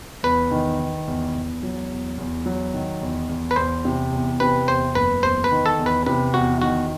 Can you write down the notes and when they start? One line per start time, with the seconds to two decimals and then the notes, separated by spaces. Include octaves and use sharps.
0.23 E2 B4
0.51 D#3
0.79 D#3
1.08 E2
1.35 E2
1.63 F#3
1.90 E2
2.18 E2
2.46 F#3
2.74 D#3
3.02 E2
3.29 E2
3.51 B4
3.56 E2 C5
3.85 C3
4.12 E2
4.40 C3 B4
4.68 E2 C5
4.95 F#1 B4
5.23 E2 C5
5.44 B4
5.51 D#3
5.66 A4
5.79 E2
5.86 B4
6.06 C3 B4
6.34 E2 F#4
6.62 D#3 F#4